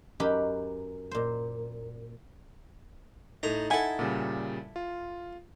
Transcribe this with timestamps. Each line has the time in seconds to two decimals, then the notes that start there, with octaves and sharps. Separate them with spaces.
0.20 F#2 D#4 G4 B4 G5 B5
1.11 A#2 C5
3.43 A2 D#4 A#5
3.70 E4 A4 F#5 G#5
3.99 A#2 C#3 G3
4.76 F4